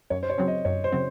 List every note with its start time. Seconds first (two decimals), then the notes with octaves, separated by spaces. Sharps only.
0.10 F#2 C#5
0.23 C5
0.30 C#5
0.38 C#3 F#3 C4
0.48 D#5
0.65 F#2 C#5
0.84 C5
0.92 C#3 F#3 C4